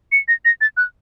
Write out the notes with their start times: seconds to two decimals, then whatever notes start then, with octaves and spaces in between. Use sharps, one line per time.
0.12 C#7
0.28 A#6
0.45 A#6
0.61 A6
0.77 F#6